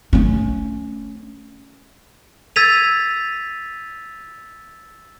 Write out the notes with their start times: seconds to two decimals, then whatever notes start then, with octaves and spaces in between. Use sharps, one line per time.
0.13 A3 C#4
2.56 E6 G#6 A6 B6 D#7 F7